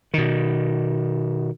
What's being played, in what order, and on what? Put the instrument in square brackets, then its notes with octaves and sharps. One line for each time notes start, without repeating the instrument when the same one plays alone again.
[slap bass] B2 D#3